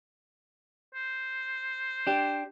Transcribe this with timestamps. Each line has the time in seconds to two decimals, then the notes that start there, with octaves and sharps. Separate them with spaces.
0.95 C5
2.07 D4 G4